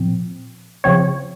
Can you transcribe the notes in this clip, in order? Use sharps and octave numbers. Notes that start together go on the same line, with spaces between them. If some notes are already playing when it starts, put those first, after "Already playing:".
Already playing: A#2 F3 C4
C#3 F3 C4 C#5